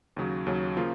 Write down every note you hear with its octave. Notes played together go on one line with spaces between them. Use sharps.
D#2 C#3 F#3
D#2 C#3 F#3
C#3 F3 A#3 F4